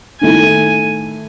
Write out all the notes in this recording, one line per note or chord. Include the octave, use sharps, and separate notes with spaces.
D#3 A3 E4 G#5